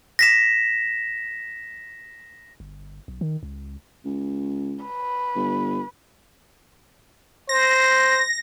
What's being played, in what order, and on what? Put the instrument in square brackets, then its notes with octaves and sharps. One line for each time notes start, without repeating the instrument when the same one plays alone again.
[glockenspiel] A#6 B6 E7
[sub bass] G1
B1
D#3
C#2
[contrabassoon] C#2
[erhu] B4
[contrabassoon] G1
[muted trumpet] C5 [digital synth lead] A#6